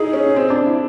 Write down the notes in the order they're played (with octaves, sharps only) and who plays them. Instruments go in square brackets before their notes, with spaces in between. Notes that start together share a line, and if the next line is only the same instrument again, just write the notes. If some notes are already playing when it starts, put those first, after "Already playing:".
Already playing: [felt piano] D#4 E4 [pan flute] G#4
[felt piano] C#4
C4
D4
E4